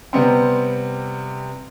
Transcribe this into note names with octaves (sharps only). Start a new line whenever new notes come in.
C3 G3 B3 C4